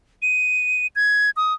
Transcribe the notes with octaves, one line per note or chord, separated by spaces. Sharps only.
D#7
G#6
D#6